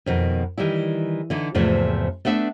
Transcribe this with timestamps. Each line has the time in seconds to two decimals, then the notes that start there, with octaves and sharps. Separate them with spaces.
0.06 F2 B2 D#3
0.58 D#3 E3 G3 E4
1.30 D3 E3 D#4
1.55 E2 G#2 C3 F3 A3
2.25 A3 B3 D4 E5